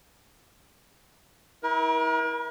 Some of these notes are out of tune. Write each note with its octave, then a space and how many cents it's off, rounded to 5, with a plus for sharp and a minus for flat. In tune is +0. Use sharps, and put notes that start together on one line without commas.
E4 -35 A#4 +40